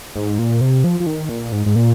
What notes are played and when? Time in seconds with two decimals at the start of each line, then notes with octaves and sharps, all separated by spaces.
0.16 G#2
0.39 A#2
0.61 C3
0.84 F3
1.00 F3
1.06 D#3
1.29 A#2
1.52 G#2
1.66 G#2
1.76 A#2